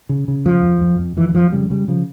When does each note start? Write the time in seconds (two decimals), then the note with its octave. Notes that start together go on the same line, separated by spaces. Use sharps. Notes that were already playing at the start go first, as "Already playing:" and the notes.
0.09 C#3
0.28 C#3
0.45 F2 F3
0.63 F2
0.81 F2
0.99 F2
1.17 F2 E3
1.29 E3
1.35 F2 F3
1.52 C#3 G3
1.70 C#3 G3
1.88 C#3 F3